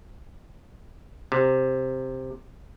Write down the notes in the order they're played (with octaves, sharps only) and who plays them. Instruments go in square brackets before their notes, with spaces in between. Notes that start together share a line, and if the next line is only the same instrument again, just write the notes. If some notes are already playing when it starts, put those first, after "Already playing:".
[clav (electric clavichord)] C3